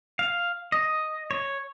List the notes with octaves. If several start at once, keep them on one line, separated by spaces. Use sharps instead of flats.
F5
D#5
C#5